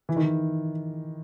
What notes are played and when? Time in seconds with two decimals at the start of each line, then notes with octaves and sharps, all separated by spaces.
0.09 E3
0.16 D#3
0.23 E3